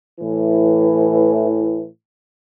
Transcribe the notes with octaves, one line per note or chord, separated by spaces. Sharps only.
A2 E3